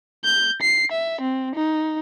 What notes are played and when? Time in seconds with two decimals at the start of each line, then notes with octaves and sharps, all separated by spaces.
0.24 G6
0.62 C7
0.92 E5
1.21 C4
1.55 D#4